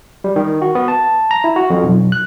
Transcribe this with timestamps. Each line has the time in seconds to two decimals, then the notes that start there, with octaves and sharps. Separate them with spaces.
0.24 G3
0.36 D#3
0.62 F#4
0.75 B3
0.88 A5
1.31 A#5
1.44 E4
1.56 F#4
1.70 F2
1.83 B1
2.12 F#6